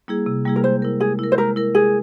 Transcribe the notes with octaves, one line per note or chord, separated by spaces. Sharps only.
G3 A#3 E4 G#4
C3
G3 A#3 E4 G#4
A#4
G#3 C5
E4 A#4
G#3 G#4
E4 A#4
C5
G#3 A#4
E4 A#4
G#3 G#4